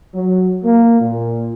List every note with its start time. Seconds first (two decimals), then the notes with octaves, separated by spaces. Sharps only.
0.15 F#3
0.64 A#3
0.99 A#2